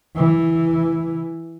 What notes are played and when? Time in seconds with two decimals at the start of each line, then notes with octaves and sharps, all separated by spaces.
0.17 E3